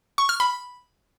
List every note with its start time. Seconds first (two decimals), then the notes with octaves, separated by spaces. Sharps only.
0.18 C#6
0.29 F6
0.40 B5